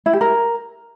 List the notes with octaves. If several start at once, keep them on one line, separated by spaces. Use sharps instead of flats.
E4
G4
A#4